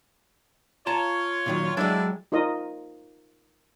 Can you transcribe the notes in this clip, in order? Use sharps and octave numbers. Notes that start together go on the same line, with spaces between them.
F4 C#5 A5 A#5
A#2 D#3 F#3
F#3 G#3 D4 E4
D#4 F4 A#4 D#5